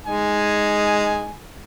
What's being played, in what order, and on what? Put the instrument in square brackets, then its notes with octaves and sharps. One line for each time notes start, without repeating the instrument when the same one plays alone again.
[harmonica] G#3 D#4 G#5